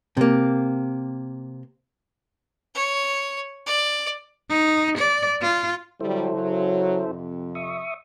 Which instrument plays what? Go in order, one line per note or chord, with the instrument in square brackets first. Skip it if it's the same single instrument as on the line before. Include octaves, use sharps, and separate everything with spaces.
[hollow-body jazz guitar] C3 A#3
[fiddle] C#5
D5
[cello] D#4
D5
F4
[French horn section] D3 F#3 G3 [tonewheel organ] E4 A4 C5
[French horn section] C#3 F#3
F2 C3
[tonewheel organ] E5 C#6 D#6